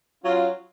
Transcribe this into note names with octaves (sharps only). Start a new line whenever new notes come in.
F#3 C#4 F4